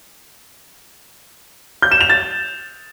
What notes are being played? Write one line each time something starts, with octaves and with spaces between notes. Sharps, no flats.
G6
E7
F7
A6